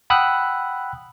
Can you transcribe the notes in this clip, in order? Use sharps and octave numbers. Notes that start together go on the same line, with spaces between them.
F#5 G5 B5 D#6 E6 F#6